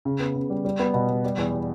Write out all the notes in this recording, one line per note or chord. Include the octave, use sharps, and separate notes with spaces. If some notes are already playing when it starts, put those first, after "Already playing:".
C#3
B3
C#3
G3
G3
B3
B2
G3
G3
E2
G3